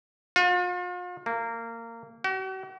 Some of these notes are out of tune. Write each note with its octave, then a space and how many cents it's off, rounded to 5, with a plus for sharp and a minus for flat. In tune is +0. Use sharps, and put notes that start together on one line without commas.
F4 +40
A#3 -20
F#4 +45